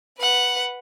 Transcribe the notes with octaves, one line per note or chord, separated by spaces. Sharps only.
B4 F#5